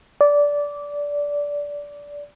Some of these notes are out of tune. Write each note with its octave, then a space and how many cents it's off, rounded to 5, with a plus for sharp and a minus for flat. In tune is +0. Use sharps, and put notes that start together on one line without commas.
D5 -15